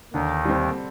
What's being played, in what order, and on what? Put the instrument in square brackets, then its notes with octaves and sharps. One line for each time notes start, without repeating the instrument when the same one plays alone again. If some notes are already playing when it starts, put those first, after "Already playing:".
[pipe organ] D#2 D#3 [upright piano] D3
[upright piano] G3 C4